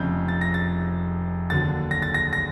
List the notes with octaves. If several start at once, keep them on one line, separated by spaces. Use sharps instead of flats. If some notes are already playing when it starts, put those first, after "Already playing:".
Already playing: F1 F2 C#3 G6
A6
A#6
A6
D#2 D3 F#3 A6
A#6
A6
A#6
A#6